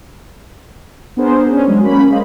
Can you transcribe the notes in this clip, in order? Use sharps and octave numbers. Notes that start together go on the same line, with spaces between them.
B3 D4 G#4 A#4 C5
C#4 D4
F#3 G#3
A#3 C#4 B5
G#3 A#3 C5 D#5 F5